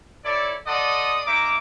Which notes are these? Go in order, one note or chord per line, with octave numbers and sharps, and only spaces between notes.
E4 A4 C#5 D5
A4 D5 D#5 F#5 C6 D#6
A#3 D#4 E5 A#5 D6